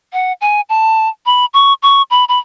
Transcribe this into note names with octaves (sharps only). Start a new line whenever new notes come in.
F#5
G#5
A5
B5
C#6
C#6
B5
B5